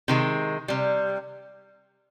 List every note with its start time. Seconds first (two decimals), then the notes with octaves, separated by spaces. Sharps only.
0.08 C3 D#3 G#3
0.68 C3 G3